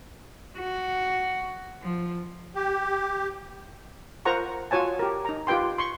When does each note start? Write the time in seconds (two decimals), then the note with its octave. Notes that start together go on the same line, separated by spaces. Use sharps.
0.59 F#4
1.83 F3
2.54 G4
4.25 F4 A#4 C5 F#5 A#5 C#6
4.71 F4 F#4 C#5 G#5 A5
4.99 G4 A#4
5.25 D#4 A#5
5.47 F4 G4 B4 G5 C6
5.78 C6 C#6